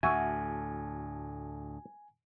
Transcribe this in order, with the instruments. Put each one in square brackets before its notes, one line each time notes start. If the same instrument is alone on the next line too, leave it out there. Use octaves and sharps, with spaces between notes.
[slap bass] D2 A2 [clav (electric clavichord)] F#4 E5 [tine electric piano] G#5